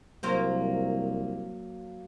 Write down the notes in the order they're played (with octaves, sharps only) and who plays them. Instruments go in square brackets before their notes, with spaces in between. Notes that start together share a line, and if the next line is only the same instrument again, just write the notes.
[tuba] C2 [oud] F#3 A#3 C5